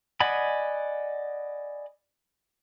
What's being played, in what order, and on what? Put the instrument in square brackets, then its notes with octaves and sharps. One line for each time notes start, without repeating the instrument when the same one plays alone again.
[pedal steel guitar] D5 D#5 F#5 G#5 B5